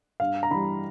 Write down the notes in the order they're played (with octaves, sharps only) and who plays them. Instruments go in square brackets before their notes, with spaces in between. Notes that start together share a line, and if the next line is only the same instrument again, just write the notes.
[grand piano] G2 F5
A#5
E3 G3 B5